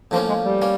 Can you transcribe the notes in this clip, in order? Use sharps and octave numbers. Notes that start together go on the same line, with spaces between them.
A2 F3 A#3 C4 C#4
G#3
G3
A#3 C#4